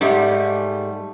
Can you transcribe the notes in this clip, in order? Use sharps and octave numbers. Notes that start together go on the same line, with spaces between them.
G#2 G3 A3